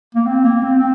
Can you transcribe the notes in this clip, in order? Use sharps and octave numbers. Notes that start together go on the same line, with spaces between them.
A#3
C4
A#3
C4
C4